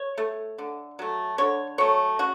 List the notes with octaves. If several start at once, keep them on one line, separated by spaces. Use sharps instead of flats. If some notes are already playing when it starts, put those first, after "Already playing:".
Already playing: C#5
A3
D3
F#3 A3
D3 C#5
F#3 A3 C#5
C#3 F#4